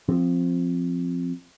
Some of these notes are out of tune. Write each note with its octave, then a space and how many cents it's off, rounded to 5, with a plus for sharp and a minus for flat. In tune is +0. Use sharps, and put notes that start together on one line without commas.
F3 +0 C4 +0